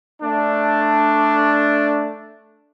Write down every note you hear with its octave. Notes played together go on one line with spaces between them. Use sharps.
A3 D4